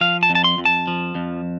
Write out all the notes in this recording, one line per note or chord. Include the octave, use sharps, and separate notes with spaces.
F3 F5
A5
F2
A5
C6
F2
A5
F3
F2